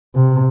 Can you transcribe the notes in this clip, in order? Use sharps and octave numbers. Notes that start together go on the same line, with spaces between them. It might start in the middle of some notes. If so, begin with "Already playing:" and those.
C3